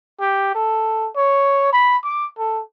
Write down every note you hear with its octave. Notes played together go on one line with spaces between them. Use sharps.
G4
A4
C#5
B5
D6
A4